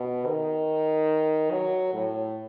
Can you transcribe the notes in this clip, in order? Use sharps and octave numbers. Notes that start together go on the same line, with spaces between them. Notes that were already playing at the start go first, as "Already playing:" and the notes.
Already playing: B2
D#3
F#3
A2